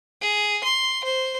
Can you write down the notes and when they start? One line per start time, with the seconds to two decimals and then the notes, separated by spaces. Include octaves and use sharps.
0.21 G#4
0.64 C6
1.04 C5